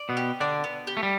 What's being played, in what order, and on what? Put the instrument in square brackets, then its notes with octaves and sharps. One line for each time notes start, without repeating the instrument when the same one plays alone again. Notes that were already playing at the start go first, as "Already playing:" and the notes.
Already playing: [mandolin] D5
[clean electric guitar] B2 B3
[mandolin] G4
[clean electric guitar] D3 D4 [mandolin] D5
[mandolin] B3
G4
[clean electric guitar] A3
G3